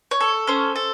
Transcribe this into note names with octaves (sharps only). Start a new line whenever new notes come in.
C#5
A4
C#4 C5
A4